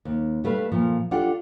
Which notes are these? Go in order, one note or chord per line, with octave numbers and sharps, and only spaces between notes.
D#2
G3 A3 B4 F5
A#2 F3
D4 F4 G4 A4 F#5